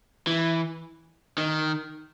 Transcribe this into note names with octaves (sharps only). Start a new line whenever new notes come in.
E3
D#3